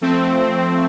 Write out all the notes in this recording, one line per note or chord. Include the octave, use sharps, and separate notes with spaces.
F3 A3 C4